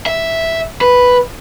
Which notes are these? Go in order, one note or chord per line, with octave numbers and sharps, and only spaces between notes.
E5
B4